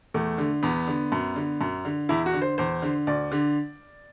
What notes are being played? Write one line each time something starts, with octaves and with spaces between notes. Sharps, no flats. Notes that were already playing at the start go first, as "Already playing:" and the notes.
E2 A3
D3
E2 B3
D3
F#2
D3
F#2
D3
E2 E4
F#4
D3
C5
E2 C5
D3
D2 D5
D3